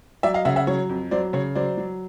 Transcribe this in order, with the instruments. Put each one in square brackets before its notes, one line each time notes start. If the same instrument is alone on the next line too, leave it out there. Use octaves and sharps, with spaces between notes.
[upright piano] F#3 D5 E5
D#5 F5
C#3 E5 F#5
E5 F#5
F#3 C#5
F2
F#3 C5 D5
C#3 C#5
F#3 C5 D5
F#3